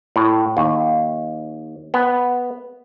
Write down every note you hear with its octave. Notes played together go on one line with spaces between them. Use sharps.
A2
D#2
B3